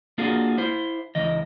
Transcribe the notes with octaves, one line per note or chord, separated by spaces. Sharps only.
A#3 D4 F4 F#4 G#4 A4
E4 C5
C#2 E3 D#5